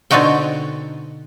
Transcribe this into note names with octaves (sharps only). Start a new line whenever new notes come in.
B2 D3 C4 D#4 F#4 G5